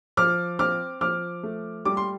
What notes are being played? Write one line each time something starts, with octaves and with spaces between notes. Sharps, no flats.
F3 D6 F6
C4 D6 F6
F3 D6 F6
A3
G3 D6
C6